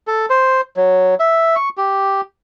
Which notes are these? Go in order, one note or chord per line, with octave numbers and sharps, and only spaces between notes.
A4
C5
F#3
E5
C#6
G4